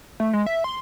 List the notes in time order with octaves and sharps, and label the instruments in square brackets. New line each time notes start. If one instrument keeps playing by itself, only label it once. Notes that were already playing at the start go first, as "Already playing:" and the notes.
[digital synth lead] A3
G#3
E5
C6